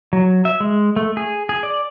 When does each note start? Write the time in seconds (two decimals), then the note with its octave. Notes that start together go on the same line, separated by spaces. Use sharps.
0.13 F#3
0.45 E5
0.60 G#3
0.96 A3
1.17 G#4
1.49 G#4
1.63 D5